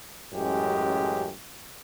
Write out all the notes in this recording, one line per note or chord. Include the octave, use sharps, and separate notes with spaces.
A1 F#2 G#3 G4